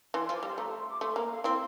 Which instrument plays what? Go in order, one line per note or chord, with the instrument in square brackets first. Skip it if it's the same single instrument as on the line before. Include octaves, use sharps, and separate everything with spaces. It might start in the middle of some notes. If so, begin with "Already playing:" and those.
[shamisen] E3 [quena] C6
[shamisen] F3 [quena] C6
[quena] D6
[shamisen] G3 [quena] C6
[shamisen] A3 [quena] A#5
[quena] A5
C6
D6
[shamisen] A3 [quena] C6
[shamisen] A#3 [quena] A#5
[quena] F5
[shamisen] C4 E4 [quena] C6